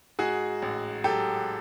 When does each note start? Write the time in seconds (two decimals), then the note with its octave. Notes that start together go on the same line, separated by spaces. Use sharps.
0.19 G#2 F#4 G#4
0.62 A1
1.04 F#3 G4 A4